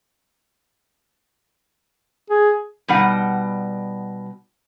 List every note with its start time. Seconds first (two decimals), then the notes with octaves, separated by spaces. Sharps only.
2.30 G#4
2.88 B2 G3 D#4 F#5